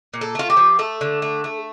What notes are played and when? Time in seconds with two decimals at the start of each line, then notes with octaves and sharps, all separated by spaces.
0.14 A#2
0.21 A4
0.35 A3 F4
0.50 G4
0.57 F3
0.79 A3 A4
1.01 D3
1.22 A3
1.44 A3